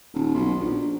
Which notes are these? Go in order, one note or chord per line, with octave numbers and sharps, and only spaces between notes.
D#1
B1
A#1